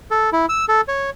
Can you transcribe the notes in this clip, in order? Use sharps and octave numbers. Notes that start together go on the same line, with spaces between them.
A4
E4
E6
A4
C#5